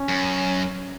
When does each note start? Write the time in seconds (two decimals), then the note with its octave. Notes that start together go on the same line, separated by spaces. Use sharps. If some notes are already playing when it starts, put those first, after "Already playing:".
Already playing: C#4
0.09 F#2